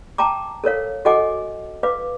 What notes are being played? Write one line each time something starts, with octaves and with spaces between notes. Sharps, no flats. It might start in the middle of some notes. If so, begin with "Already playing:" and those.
G5 A5 A#5 D6
A4 A#4 C#5 F5
F#4 A4 D#5 F#5 G#5 D6
B4 F5 D6